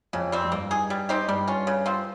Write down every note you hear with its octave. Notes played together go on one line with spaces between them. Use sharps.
F2 C#3
G3 C4
F2
G2 A#3
D#4 G#4
G3
C4 D#4 G4
G2 G3
C#4 F4
C#3
F3 C4